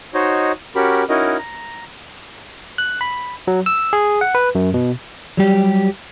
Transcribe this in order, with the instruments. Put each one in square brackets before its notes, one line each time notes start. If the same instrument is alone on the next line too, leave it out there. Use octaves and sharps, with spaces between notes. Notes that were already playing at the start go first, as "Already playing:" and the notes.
[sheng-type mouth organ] D#4 F#4 C5 C#5 D#5
C#4 F#4 G4 A#4 B5
C#4 D#4 E4 F#4 A#4 D#5
A#5
[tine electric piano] F#6
B5
F#3
E6
G#4
F#5
B4
F#2
B2
[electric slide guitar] F#3 G3 G4